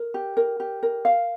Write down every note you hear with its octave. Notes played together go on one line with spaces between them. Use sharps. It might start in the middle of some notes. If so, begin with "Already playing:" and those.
Already playing: A#4
G4
A#4
G4
A#4
F5